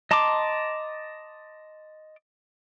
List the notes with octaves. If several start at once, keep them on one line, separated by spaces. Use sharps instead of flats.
D#5 A5 A#5 C6 D6